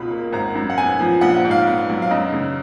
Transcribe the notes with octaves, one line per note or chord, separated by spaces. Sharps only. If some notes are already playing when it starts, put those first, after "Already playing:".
Already playing: C#2 B2 F4 B5
A#3
G#1 A#5
F#2
F#5
B3 G#5
F3
A#1 F#5
F#5
G#2
F5
B3
F#3
F5
F#2 D#5
C#3